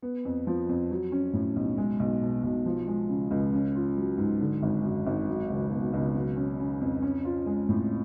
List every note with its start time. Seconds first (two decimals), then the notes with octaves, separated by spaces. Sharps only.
0.02 B3
0.25 F2
0.47 F3
0.69 F2
0.91 F#3
1.12 C#4
1.33 A2
1.56 B1
1.77 G#3
2.00 B1
2.22 B2
2.43 B1
2.66 F3
2.87 G#3
3.09 C#3
3.31 C#2
3.53 C#4
3.75 F4
3.97 F#3
4.18 G#2
4.40 D3
4.62 G#1
4.83 F#2
5.06 G#1
5.28 F#3
5.50 C#2
5.72 B2
5.93 C#2
6.15 F#3
6.36 C#4
6.59 C#3
6.81 F2
7.02 C#4
7.25 F4
7.46 G#3
7.69 A2